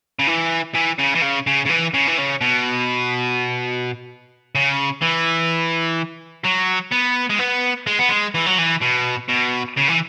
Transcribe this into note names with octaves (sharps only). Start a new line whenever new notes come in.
C#3
E3
E3
C#3
E3
C#3
C#3
C#3
E3
C#3
E3
C#3
B2
C#3
E3
F#3
B3
G#3
B3
G#3
B3
G#3
E3
F#3
E3
B2
B2
C#3
E3